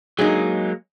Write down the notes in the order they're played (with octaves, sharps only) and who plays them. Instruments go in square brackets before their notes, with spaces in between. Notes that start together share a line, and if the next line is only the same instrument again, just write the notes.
[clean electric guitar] F#3 G#3 A#3 [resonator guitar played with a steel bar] D#4 G#4